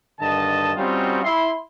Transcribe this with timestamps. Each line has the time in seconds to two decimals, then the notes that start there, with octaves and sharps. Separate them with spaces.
0.19 G2 D3 D#3 D#5 A5
0.77 G3 C4 C#4 D#4 F4 F#4
1.23 E4 C6